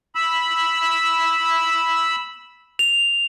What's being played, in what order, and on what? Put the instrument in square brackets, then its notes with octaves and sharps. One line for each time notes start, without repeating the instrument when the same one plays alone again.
[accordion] B5 E6
[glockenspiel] F7